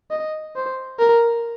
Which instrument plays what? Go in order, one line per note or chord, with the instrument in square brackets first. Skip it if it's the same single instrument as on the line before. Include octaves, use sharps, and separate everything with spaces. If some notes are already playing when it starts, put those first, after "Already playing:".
[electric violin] D#5
C5
A#4